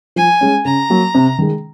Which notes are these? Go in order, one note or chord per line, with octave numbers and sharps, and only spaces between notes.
F3 G#5
G#3 C#4
C#3 A#5
F#3 A#3
C3
D#3 G#3